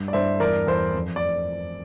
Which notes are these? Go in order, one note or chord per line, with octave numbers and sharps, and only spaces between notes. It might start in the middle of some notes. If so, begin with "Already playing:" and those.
Already playing: G2 G3
D5
G2 C5 E5
E2 A#4 D5
E2 C5
F2
D5